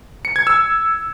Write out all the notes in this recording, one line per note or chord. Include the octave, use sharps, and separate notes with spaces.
C#7
G#6
E6